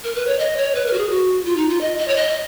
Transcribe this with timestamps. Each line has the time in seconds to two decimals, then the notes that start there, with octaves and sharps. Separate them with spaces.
0.04 A#4
0.15 B4
0.27 C#5
0.39 D#5
0.57 C#5
0.75 B4
0.86 A#4
0.93 F#4
0.98 G#4
1.10 F#4
1.45 F4
1.57 D#4
1.69 F4
1.81 D#5
1.98 D#5
2.08 C#5
2.16 D#5